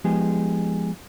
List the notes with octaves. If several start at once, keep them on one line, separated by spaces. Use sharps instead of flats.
F3 G#3 B3 D#4 G4 G#4